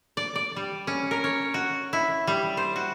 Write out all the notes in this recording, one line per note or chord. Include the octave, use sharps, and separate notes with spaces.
D5
D5
G3
C#4
A#4
C#5
F#4
E4
G3
C5
F#4